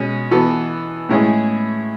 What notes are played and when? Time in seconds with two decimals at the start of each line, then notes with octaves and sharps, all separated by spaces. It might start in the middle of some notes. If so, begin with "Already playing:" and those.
Already playing: B2 G#3 C#4
0.31 E3 B3 F#4 A4
1.09 A2 G#3 C#4 E4 G#4